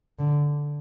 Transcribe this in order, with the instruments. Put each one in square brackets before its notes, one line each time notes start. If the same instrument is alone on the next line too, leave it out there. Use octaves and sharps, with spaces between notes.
[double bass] D3